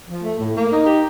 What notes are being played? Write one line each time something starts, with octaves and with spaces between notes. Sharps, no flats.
F3
A3
A2
A#3
D#4
G4